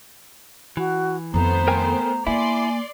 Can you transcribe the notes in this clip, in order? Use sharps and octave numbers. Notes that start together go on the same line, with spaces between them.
E3 F#4
F2 D#3 A3 B3 C5 A#5
A#4 G5 G#5
A#3 E4 D5 G#5 C6